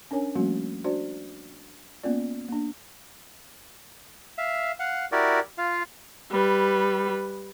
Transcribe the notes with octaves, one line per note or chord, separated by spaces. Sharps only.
C#4 D4 A#4 C#5 G#5
F3 G3 A3 A#3 C#4 F#4
D4 F#4 C5 D5
A#3 B3 C#4 F4 D5
A#3 D4
E5 F5
F5 F#5
E4 F#4 G4 A#4 D5
F4 F5
G3 B4